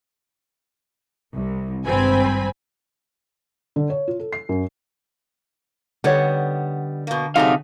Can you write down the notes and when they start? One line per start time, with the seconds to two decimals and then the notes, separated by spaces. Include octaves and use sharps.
1.35 C2
1.86 G#1 G2 C4 G#5 B5
3.76 D3
3.90 C#5
4.08 F4
4.19 A4
4.33 C7
4.49 F#2
6.04 D3 G3 B3 D#4 C#5 F#5
7.07 B2 A#3
7.36 C3 F#3 A3 D#4 G#4 F5